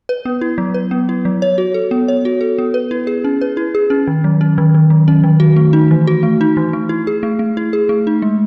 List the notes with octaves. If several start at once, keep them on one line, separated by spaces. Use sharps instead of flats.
B4
B3
E4
F#3
B4
B3
E4
F#3
C#5
F#4
A4
B3
C#5
F#4
A4
B3
B4
E4
G#4
C#4
B4
E4
G#4
C#4
D#3
F#3
C#4
D#3
D#3
F#3
C#4
D#3
F#4
A3
D#4
E3
F#4
A3
D#4
E3
A3
E4
G#4
A3
A3
E4
G#4
A3
D#4
G#3